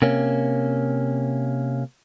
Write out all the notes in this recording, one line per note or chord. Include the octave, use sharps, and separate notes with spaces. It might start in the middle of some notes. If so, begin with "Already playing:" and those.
C3 A#3 C#4